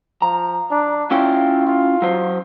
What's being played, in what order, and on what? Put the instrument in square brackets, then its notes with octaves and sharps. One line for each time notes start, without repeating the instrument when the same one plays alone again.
[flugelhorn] F3 [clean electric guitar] A#5
[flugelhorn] D4
[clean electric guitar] C#4 E4 G5 [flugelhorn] F4
[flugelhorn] F4
[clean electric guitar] F#3 C5